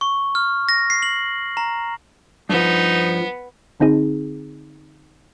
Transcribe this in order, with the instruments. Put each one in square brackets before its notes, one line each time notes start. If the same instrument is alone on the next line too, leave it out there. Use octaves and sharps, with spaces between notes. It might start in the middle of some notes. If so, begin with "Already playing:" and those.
[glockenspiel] C#6
F6
A#6
C7
F#7
A#5
[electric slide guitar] G2 F3 [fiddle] B3 [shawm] D#4
[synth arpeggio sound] G#1 D3 C4 D#4 G#4